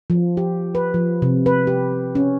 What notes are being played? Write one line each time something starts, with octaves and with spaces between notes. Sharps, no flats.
F3
G4
B4
F3
C3
B4
G4
C#4